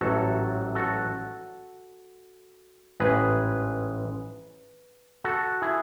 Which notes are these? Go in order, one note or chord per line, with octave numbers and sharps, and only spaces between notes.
A1 G#2 F#3 A3 F#4 A4
F#4 A4
A1 G#2 G#3 G#4 B4
F#4 A4
E4 G#4